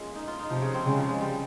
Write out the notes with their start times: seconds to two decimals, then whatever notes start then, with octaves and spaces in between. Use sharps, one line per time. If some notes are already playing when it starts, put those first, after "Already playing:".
Already playing: G#3 A#3 C#4 F4
0.15 D#4
0.27 F4
0.39 D#4
0.50 C3 F3
0.62 C#3
0.74 C4
0.85 C#3 G#3
0.97 F3
1.09 G#3
1.21 G3